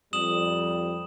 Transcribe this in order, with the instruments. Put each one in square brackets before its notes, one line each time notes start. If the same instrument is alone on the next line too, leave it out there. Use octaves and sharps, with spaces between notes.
[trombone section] F2 G3 [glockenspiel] D#6 E7 F#7